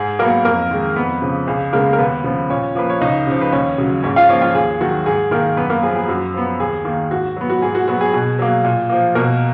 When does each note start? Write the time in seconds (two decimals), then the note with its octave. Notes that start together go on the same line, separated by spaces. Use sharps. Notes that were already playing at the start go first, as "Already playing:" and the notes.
Already playing: G#2 G#4
0.19 F#3 A#3 B3 A#4
0.45 F2 A#3 A#4
0.71 D#3 G#3
0.96 F2 B3 B4
1.22 C#3 F3
1.47 C#2 G#4
1.73 C#3 G#3 A#3 B3 A#4
1.93 A#4
1.98 D#2 B3 B4
2.24 C#3 F3 B3
2.50 A#2 C#4 C#5
2.75 F3 A#3 B4
2.90 C#5
3.01 C#2 D#4 D#5
3.27 C#3 F3
3.41 B4
3.52 D#2 C#4 C#5
3.78 C#3 F#3
4.03 G#2 C#4 C#5
4.16 F4 F5
4.29 F3 A#3 C#4 C#5
4.42 F4 F5
4.55 D#2 G#4
4.80 D#3 F#3 F#4
5.06 G#2 G#4
5.31 D#3 A#3 A#4
5.57 F#2 B3 B4
5.70 A#3 A#4
5.83 F3 B3 G#4
5.95 G#4
6.08 F#2 F#4
6.34 F3 B3
6.60 D#2 G#4
6.85 D#3 A#3
7.11 G#2 F#4
7.37 F#3 B3
7.50 F#4
7.62 G#2 G#4
7.75 F#4
7.88 F#3 B3 F#4
8.01 G#4
8.13 B2 G#4
8.39 F#3 A#3
8.65 A#2
8.90 F3 A#3
9.15 B2 A#3 A#4